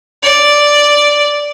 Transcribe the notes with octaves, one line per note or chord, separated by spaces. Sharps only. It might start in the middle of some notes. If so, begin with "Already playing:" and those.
D5